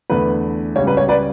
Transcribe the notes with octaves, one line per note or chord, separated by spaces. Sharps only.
E2 D3 A3 B4
C#2 C#3 G3 C#5
B4
C#5
B4 D5